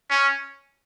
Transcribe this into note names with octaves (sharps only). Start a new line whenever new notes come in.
C#4